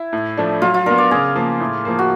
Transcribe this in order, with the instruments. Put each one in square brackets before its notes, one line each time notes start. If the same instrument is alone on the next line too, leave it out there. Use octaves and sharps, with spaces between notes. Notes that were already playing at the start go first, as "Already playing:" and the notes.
Already playing: [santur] E4
[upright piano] A2
F3 A3 D4
[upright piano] F#3 [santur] F4
[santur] F4
[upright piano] B3 D4 [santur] A#4
[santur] D5
[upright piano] C#3 [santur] G#4
[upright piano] F3 A#3
A2
F3 A#3
[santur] F#4